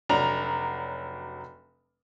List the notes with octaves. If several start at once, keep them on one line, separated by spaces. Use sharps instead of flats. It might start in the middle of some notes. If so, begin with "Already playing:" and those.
F1 F#3 D4 A#5 F7